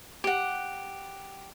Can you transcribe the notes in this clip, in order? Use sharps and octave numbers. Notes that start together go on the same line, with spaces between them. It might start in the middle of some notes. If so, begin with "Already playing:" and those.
G4 F#5